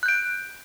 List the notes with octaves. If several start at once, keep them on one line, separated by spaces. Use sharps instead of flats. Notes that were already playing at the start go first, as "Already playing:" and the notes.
F#6 G6 D7